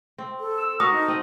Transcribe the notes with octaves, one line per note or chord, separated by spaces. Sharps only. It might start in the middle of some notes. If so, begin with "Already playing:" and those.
C4
A4
E6
F#4 A4 A#4 D#6
D#4
C4 D#5